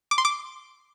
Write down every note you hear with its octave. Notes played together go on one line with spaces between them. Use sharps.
D6
C6
D6